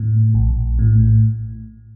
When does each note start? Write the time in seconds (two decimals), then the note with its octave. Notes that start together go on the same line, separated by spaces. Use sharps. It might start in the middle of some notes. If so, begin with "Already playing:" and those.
Already playing: A2
0.34 A#1
0.79 A2